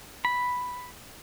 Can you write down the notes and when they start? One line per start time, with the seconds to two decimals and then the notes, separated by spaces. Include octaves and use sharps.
0.25 B5